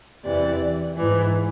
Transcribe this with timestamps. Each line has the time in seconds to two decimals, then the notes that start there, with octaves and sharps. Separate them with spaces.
0.23 E2 C3 E3 D5
0.97 G#2 E3